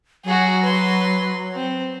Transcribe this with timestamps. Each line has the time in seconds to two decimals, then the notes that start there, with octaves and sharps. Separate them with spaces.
0.25 F#3 F#4 G#4
0.63 B4 C6
1.54 C4